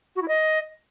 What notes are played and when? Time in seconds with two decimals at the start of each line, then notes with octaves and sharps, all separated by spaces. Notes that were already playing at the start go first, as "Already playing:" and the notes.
0.15 F#4
0.22 E4
0.28 D#5